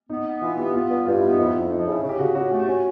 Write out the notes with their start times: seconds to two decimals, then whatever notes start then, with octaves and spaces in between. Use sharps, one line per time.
0.09 B3 D#4
0.26 B3
0.41 E3 F4
0.58 B3 G4
0.74 B3 F4
0.90 G2
1.06 G2 F4
1.19 B3 E4
1.31 D#4
1.38 F2 E4
1.55 F2
1.70 F3 D#4
1.86 C#3
1.92 E4
2.03 C#3
2.09 G4
2.19 C#3 F#4
2.35 C#3 F#4
2.51 A3 G4
2.66 C#4 F#4